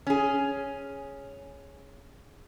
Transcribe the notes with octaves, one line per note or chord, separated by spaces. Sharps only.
C#4 G#4